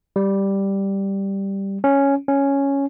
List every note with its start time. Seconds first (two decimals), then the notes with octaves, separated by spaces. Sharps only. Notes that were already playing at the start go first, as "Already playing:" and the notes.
0.16 G3
1.84 C#4
2.28 C#4